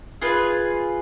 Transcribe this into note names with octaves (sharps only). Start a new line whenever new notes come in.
F4 G#4 B4